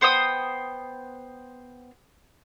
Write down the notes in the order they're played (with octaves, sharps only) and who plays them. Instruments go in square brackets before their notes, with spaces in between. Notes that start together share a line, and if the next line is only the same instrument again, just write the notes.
[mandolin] B3 C5 G5 D#6